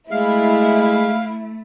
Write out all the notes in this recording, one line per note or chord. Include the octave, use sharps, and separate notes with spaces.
G#3 A3 E4 F5